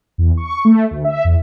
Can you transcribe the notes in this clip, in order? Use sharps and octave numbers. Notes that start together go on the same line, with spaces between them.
E2
C#6
A3
D2
E5
E2